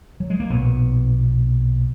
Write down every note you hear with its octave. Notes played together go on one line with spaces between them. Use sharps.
F#3
G#3
A#3
B1 A#2 B3